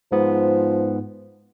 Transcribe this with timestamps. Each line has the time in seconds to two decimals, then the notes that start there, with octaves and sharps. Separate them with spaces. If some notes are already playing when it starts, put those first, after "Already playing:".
0.12 G#2 F3 B3